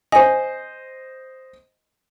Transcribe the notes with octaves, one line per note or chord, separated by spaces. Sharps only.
C5 D#5 G#5